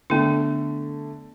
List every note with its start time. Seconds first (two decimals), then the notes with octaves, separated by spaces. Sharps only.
0.10 D3 A3 B3 E4